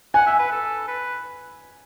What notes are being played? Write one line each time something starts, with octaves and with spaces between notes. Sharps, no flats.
F#5 G#5
E5
B4
A4
B4